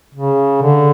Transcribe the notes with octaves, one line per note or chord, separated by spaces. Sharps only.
C#3
D3